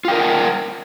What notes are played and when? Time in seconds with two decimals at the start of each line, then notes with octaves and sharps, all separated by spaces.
0.05 F4
0.08 G5
0.12 A#4
0.15 F#5